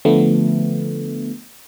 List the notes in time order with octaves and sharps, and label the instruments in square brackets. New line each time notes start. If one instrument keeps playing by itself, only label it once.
[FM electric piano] D3 F3 A3 B3